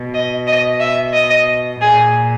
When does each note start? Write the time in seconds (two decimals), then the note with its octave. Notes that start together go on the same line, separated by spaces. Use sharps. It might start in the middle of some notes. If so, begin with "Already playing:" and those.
Already playing: B2
0.13 D#5
0.47 D#5
0.80 E5
1.13 D#5
1.81 A#2 G#4